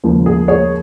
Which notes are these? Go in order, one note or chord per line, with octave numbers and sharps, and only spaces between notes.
D#2 C#3 F3 G#3
G#4
G#4 C#5